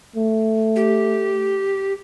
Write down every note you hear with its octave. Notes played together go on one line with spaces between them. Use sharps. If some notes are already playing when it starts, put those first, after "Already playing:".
A3
G4